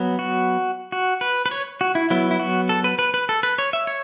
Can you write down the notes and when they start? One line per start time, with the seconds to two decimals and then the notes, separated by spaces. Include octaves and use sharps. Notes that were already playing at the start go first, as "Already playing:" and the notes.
Already playing: F#3 B3
0.19 F#4
0.92 F#4
1.21 B4
1.46 B4
1.51 C#5
1.81 F#4
1.95 E4
2.10 F#3 B3 E4
2.31 E4
2.40 F#4
2.69 A4
2.84 B4
2.99 B4
3.14 B4
3.29 A4
3.43 B4
3.58 C#5
3.73 E5
3.87 C#5